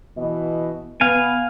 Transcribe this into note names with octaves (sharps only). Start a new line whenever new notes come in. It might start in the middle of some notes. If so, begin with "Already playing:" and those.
B2 E3 D#5
B3 F5 G#5